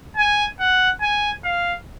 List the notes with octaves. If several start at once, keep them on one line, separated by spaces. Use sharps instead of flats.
G#5
F#5
G#5
F5